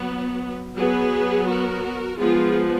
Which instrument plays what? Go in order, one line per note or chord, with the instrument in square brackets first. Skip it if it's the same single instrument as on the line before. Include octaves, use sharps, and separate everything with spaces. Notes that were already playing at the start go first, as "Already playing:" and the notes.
Already playing: [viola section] F#3 B3
F#3 B3 G#4 B4
F#4 A#4
F3 G#3 B3 F4 G#4